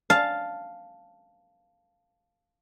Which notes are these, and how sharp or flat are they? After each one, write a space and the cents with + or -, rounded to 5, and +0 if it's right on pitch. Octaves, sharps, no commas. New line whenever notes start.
F5 +0 A5 +0